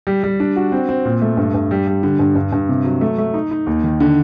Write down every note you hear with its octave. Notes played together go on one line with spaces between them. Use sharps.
G3
G3
D4
F#4
C4
C4
A#2
A3
G2
G2
G3
G3
D3
G2
G2
G2
C3
F#3
A3
A3
D#4
D#4
D#2
D#3
D3